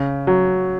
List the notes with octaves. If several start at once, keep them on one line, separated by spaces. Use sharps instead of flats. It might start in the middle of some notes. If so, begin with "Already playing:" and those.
Already playing: C#3
F#3